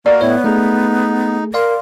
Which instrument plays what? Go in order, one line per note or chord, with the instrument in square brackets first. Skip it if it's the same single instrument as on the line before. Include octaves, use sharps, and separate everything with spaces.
[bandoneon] A#3 F#4 A#4 [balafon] D5
[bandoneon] A2 E4 [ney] B3 [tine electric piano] C#5
[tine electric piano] A3 G#4 [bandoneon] D#4
[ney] A#4 [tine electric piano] D5 F5 C6